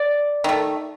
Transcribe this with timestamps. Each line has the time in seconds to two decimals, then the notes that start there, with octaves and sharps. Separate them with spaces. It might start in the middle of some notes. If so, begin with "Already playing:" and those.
Already playing: D5
0.44 D#3 A3